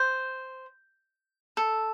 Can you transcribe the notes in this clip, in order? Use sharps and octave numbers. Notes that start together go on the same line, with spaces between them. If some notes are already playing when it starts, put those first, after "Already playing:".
Already playing: C5
A4